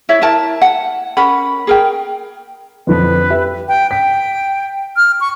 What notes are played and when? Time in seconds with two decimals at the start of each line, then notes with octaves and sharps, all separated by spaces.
0.09 E4 C#5 E5
0.22 E4 A#4 A5
0.62 F#5
1.17 C#4 A#4 F#5 B5
1.67 G#4 A#4 G5
2.87 F2 D3 F3 B4
3.30 G4 E5
3.68 G5
3.91 G5 B6
4.97 F6
5.21 C#6